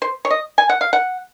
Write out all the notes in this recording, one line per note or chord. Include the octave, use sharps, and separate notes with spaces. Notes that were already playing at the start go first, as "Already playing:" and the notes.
C5
C#5
D#5
G#5
F#5
F5
F#5